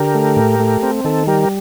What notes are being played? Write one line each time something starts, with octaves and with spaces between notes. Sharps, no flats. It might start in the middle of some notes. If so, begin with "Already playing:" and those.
Already playing: D3 G4 A#4
A3
A2
A3
C4
D#3 A4
G3 G4 A#4